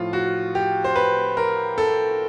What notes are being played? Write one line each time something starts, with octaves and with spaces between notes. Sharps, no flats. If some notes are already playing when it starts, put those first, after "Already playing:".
Already playing: A2 F3 F4
F#4
G4
C5
B4
A#4
A4